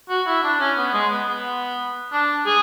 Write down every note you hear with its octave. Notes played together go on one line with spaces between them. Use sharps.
F#4
E4
D4
C#4
B3
G#3
B3
B3
D4
G#4